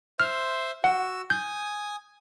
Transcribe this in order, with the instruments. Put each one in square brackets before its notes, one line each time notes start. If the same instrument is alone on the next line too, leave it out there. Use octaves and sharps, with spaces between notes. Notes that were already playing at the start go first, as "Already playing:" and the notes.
[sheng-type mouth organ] C5 E5 C6 [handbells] F6
[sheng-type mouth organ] F#4 E6 [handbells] F#5
[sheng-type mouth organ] G#5 D#6 [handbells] G6